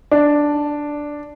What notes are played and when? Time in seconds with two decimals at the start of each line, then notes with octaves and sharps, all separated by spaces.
0.11 D4